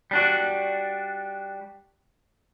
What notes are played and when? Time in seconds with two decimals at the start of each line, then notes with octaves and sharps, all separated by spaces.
0.11 G3 D4 F#4